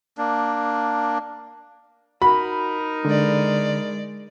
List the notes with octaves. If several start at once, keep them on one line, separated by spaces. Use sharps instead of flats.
A#3 D4
D#4 F#4 A#4 B5
D3 G#3 D5